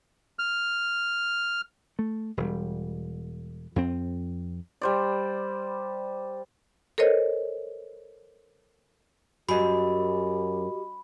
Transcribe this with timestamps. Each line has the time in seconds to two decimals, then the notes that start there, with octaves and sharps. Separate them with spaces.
0.39 F6
1.99 A3
2.37 E1 G3
3.76 F2 C4
4.81 G3 C5 D5
6.98 A4 A#4 C5 C#5 D#5
9.49 F#2 F#4 G4 D#5 B5